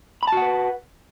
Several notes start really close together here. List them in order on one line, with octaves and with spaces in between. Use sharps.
B5 A5 F#4 F#5 B4